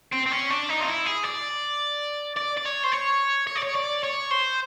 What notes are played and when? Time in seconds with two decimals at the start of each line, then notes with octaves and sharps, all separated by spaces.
0.13 C4
0.27 C4
0.32 C#4
0.50 D4
0.69 D#4
0.80 F4
0.88 E4
1.06 G#4
1.25 D5
2.36 D5
2.57 D5
2.65 C#5
2.83 C5
2.92 C#5
3.47 C#5
3.56 D5
3.63 C#5
3.75 D5
4.04 C#5
4.31 C5